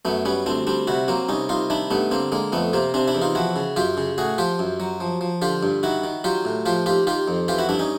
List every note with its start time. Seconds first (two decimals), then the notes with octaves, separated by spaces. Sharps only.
0.05 F#2 A3 B3
0.25 G3 B3 C#4
0.46 D2 C4 D4
0.67 G3 C4 D4
0.87 C3 E4 F#4
1.08 F#3 A#3 C4
1.29 C2 C#4 D#4
1.49 C2 D#4 F4
1.70 D#3 D4 E4
1.91 G2 A3 B3
2.11 D3 A#3 C4
2.32 D3 G#3 A#3
2.52 F2 A3 B3
2.73 C3 A#3 C4
2.94 C3 C4 D4
3.07 D4 E4
3.15 E2
3.22 D#4 F4
3.35 F3 E4 F#4
3.56 C#3
3.76 F#2 F4 G4
3.97 C#3
4.18 A2 F#4 G#4
4.38 F3 F4 G4
4.59 F#2
4.80 F#3
5.00 F3
5.21 F3
5.42 D3 F4 G4
5.63 G2
5.83 D#3 E4 F#4
6.04 D#3
6.24 F#3 F4 G4
6.45 A2
6.66 F3 F4 G4
6.86 D#2 F4 G4
7.07 D#3 F4 G4
7.28 F2
7.48 E3 F4 G4
7.58 E4 F#4
7.69 G2 D4 E4
7.79 C#4 D#4